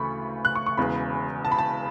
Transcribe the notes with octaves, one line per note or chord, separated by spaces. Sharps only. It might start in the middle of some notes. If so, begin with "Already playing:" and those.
Already playing: D2 C#3 E3 A3 B5 C#6
F#6
C#6
C#6
E1 E2 C#3 E3 B5
A5
B5
A5